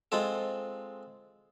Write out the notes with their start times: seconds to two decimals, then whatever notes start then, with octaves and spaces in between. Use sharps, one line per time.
0.12 G#3 C4 F4 A4